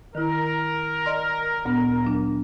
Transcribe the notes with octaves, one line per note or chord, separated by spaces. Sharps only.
D#3 E4 A#4
D5 D#5 C6
D2 A#2 B3
F#3 D4